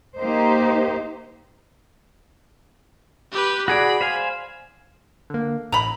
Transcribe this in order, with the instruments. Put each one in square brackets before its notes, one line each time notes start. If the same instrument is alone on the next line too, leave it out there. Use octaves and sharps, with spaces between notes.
[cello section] A#3 D#4 G4 C5
[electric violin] G4 B4
[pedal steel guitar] F#4 G#4 D5 [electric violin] B5
[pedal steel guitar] C5 F5 G#5
[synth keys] D3 A#3
[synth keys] A1 [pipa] A#5 B5